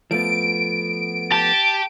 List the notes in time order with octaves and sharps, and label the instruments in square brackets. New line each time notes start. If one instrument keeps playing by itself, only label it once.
[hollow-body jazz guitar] F3 A3 B3 [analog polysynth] D7
[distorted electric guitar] G4 [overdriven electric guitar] A5